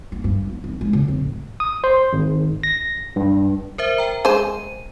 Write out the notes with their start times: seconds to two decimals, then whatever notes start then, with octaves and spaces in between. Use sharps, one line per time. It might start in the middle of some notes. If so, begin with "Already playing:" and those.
0.12 A#3
0.24 G2
0.50 B3
0.64 G#1
0.81 G#3
0.93 C#3
1.08 F2
1.21 A2
1.60 D#6
1.84 C5
2.13 G#1
2.63 A#6
3.16 G2
3.78 A#4 C5 E5
3.98 G5 A#5
4.25 G#3 C5 D#7